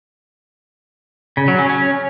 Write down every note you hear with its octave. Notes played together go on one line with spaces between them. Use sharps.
C#3
F#3
C#4
C#4